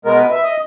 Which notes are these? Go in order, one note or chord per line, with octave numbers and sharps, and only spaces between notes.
B2 G#3 B3 A#4
B4
E5
D#5